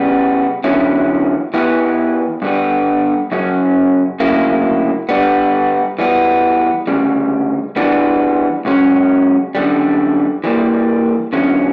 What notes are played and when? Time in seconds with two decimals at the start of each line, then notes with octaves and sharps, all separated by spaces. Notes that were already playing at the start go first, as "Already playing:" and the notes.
Already playing: C#3 G3 B3
0.64 E2 D3 F#3 C#4 E4
1.54 E3 B3 E4 G4 B4
2.42 G2 D3 G3 B3
3.32 F#2 C#3 F#3 C#4
4.20 D2 C#3 F#3 A#3 E4
5.09 G2 D3 G3 B3
5.99 E3 G3 B3
6.87 D2 C#3 G3
7.76 E3 G3 B3 D4
8.65 C#2 C#3 F#3 C#4
9.55 F#2 D3 G3
10.44 E3 G3 A#3
11.33 E2 D3 F#3 C#4